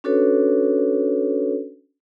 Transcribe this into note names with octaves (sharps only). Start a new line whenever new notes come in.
C#4 D4 F#4 A4 B4 C#5